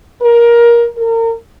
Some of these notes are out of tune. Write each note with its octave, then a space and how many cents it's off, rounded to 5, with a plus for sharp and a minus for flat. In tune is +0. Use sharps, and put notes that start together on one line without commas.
A#4 +15
A#4 -35